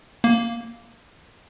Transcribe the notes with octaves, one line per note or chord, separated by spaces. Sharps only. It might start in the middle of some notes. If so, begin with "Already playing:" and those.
A#3